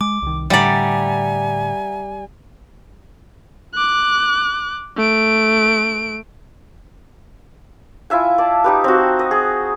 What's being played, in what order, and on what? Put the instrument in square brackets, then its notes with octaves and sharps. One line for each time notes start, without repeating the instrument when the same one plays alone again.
[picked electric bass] G#3 [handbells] D6
[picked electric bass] C2 D#3
[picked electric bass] A2 D3 [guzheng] G3 D5 [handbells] E5 F#5 A#5 [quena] G#5
[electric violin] D6 F#6
A3 D7
[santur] E4 F4 E5 G#5
D5 A5
D#4 G4 B4
C4 F#4
D#5
G#4